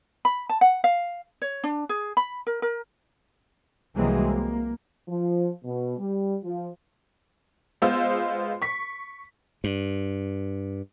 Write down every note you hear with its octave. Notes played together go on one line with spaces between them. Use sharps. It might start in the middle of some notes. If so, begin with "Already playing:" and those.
B5
A5
F#5
F5
C#5
D4
G#4
B5
A#4
A#4
C2 E3 F#3 G#3 A#3 C4
A#3
F3
B2
G3
F3
G#3 B3 F4 C5 E6
C#6 B6
G2